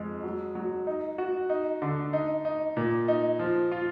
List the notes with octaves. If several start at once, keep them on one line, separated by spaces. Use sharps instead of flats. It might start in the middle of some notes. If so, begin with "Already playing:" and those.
Already playing: F2 G#3
F#3
F#3
D#4
F#4
D#4
D3
D#4
D#4
A#2
D#4
F3
F4